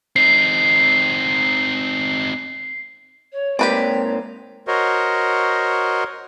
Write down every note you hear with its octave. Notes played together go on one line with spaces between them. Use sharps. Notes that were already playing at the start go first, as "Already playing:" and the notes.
C4 D#4 C7
C#5
G#2 A#3 C4 G4 B4 C#5 D5
F#4 A#4 C5 C#5 D#5